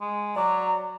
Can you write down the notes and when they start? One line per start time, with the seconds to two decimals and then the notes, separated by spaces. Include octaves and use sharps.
0.01 G#3
0.36 F#3 D5 A#5 D6